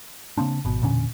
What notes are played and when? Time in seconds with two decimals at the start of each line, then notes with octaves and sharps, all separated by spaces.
0.38 C#3 A#3 C4 D4
0.65 G#1 B2
0.82 E1 A#2 D3 C#4